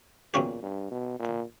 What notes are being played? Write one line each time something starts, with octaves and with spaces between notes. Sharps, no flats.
E2 A#2 C#3 F#3 C#4 G4
G2
B2
A#2